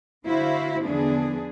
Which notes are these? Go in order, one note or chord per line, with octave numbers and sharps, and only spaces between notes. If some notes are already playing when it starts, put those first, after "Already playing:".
D3 E4 F#4 C5 F5
E2 D3 F3 B3 D4 G#4